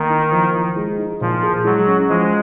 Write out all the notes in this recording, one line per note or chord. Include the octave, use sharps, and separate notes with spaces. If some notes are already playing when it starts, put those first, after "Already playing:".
Already playing: D#3 A#3
D#4
F3
F3
G#3
D#4
A#2 F3
G#4
F#3 G#3
C#4
F3 G#3